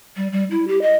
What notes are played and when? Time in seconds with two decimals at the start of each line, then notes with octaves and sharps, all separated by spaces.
0.16 G3
0.32 G3
0.51 E4
0.68 G4
0.82 D#5